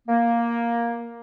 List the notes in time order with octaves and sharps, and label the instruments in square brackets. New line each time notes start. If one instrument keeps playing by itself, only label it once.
[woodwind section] A#3